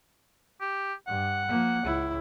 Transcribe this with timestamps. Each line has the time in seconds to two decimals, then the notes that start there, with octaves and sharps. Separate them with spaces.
0.61 G4
1.07 G2 F#5
1.49 F3 A#3
1.82 C#2 E4